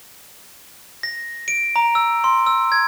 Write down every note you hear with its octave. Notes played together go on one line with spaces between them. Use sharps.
A#6
D7
A#5
E6
C6
E6
G#6